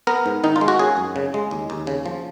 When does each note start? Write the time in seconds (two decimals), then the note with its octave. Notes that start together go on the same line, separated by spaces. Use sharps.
0.07 B3 A#4
0.26 G#2
0.44 D#3 D#4
0.56 F4
0.61 G#3
0.68 F#4
0.79 C#4 G#4
0.97 F#2
1.16 C#3
1.34 G#3
1.51 D#2
1.70 D#2
1.87 C#3
2.06 F3